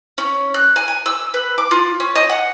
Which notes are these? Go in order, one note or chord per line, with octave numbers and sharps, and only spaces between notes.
C#4
F#6
G#5
G#5
E6
B4
D6
F4
C#4
D#5
F#5